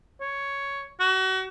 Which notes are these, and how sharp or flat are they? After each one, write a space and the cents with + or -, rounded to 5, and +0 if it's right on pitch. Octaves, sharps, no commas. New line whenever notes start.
C#5 +5
F#4 +35